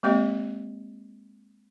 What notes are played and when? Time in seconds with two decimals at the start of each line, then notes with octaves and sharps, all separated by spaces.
0.03 G#3 A#3 C4 G4 D#5